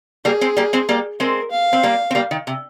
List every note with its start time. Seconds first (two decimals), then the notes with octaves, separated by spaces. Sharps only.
0.25 G3 A#3 G#4
0.41 G#3 C4
0.57 G3 A#3
0.73 G#3 C4
0.89 G3 A#3
1.20 G#3 C4 A#4
1.52 F5
1.73 C4
1.83 G3 A#3
2.11 C4
2.15 G3 A#3
2.31 D#3
2.47 C3